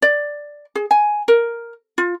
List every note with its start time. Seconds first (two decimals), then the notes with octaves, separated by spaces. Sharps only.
0.02 D5
0.75 G#4
0.91 G#5
1.28 A#4
1.98 F4